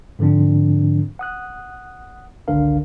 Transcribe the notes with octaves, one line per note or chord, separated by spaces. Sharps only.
G#2 D3 F3 C4 D4
F#5 D#6 F#6
G#1 C#2 D3 D4 A#4 F5